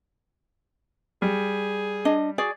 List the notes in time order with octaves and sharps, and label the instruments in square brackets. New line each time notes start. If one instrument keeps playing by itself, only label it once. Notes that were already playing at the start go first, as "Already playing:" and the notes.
[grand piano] G3 [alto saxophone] G#4
[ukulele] D4 D#5
F#4 G#4 D5